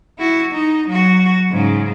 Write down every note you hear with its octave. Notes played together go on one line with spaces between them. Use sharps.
E4 F#4
D#4
F#3 F#4
G#2 C#3